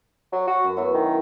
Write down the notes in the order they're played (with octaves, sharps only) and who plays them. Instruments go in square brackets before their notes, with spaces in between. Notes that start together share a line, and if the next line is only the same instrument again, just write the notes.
[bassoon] F#3
F#4
[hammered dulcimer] F#2
[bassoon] F#3 [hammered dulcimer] B3 E4
[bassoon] D#3